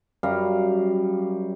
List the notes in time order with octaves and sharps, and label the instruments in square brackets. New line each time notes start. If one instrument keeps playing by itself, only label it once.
[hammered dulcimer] F#2 G3 F5 A#5